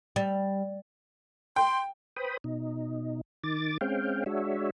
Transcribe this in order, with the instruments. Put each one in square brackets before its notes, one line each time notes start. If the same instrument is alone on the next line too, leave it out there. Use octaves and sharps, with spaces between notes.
[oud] G3
[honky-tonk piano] G5 [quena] C6
[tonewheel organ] B4 C5 G5 B5 D#6
B2 D#4
D#3 D6 A6
G#3 C4 C#4 F5 G5
G#3 D4 F#4 C#5 E5